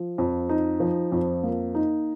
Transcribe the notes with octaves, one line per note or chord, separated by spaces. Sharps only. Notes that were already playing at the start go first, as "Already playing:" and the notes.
Already playing: F3
F2
D#4
F3
F2
A#3
D#4